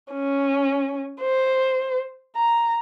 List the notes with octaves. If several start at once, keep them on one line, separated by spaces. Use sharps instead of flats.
C#4
C5
A#5